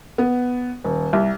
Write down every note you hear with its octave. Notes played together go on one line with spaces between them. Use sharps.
B3
D#1
C2